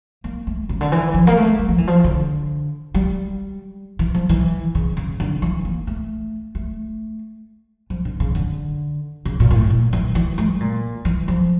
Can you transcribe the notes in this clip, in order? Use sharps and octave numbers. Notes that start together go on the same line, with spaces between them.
A#3
A3
C#3
D3
E3
F3
A#3
A3
G3
F3
E3
F3
D3
G3
E3
F3
E3
C#3
C#3
D3
E3
A#3
A3
A3
F3
D3
C#3
D3
C#3
A#2
A#2
A2
A#2
E3
E3
A3
C#3
A#2
E3
F3